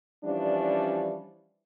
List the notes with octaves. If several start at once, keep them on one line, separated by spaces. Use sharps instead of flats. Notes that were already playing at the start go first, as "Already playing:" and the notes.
E3 F3 G3 C#4 D4 D5